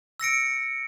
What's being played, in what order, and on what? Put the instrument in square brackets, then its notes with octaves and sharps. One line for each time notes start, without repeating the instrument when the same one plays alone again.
[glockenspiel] E6 A#6 C#7 D7